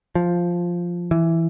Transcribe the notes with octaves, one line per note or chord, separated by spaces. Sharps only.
F3
E3